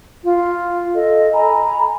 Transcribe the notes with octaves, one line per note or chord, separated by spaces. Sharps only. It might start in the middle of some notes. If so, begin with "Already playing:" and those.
F4
A4 D#5
G#5 A#5 B5